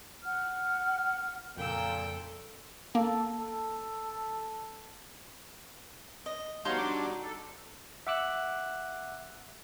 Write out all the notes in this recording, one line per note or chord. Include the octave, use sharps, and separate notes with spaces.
F#5 F6
F2 A#2 C#3 A#3 A4 G5 E6
A#3 A4
A4
D#5
G3 B3 D#4 F#4 C#5 F5 A#5 C6
D4 D6
A4
E5 F#5 D6 E6 F#6